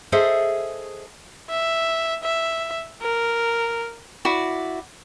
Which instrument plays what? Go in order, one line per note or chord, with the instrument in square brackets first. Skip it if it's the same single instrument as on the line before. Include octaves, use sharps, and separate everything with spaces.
[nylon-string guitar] G#4 A4 C5 D#5 E5
[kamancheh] E5
E5
A#4
[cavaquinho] E4 F#4 D5